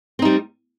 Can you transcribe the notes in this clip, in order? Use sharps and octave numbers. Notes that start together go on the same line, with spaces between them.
G3 C4 D#4